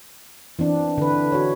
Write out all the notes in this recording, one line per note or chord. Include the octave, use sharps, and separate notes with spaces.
E3 C4 D4
D3 B4
F#4 C#5